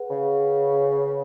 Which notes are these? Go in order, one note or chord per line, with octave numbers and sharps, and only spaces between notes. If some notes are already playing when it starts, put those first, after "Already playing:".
Already playing: G#4 B4 F#5
C#3